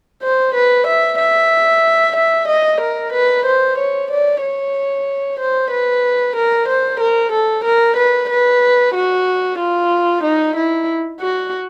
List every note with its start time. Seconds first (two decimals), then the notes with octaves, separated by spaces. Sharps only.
0.23 C5
0.55 B4
0.87 E5
1.19 E5
2.16 E5
2.48 D#5
2.81 A#4
3.13 B4
3.46 C5
3.78 C#5
4.11 D5
4.42 C#5
5.40 C5
5.71 B4
6.36 A#4
6.68 C5
7.00 A#4
7.32 A4
7.64 A#4
7.97 B4
8.30 B4
8.95 F#4
9.59 F4
10.24 D#4
10.56 E4
11.20 F#4